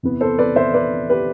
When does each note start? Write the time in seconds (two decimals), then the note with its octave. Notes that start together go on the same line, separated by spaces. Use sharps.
0.03 E2 C3 E3 B3
0.21 A4 C5
0.39 B4 D5
0.56 C5 E5
0.74 B4 D5
1.09 G4 B4